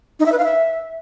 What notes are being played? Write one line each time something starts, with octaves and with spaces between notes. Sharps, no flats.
D#4
E5
B4
F5
E5